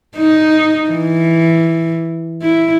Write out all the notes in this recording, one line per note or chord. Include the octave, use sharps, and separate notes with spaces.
D#4
E3
E4